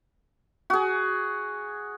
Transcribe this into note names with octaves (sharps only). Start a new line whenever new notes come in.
F#4 G#4